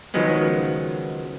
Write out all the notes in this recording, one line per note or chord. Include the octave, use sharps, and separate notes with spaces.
C#2 D#3 F3 F#3 G#3 B3